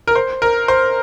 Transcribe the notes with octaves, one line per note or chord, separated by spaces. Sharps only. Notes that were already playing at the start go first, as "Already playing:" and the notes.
A#4
C5
A#4
C5